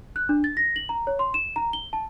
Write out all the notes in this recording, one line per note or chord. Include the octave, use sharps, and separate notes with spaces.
F#6
D4
A6
A#6
F#7
A#5
C#5
C6
E7
A#5
G7
A5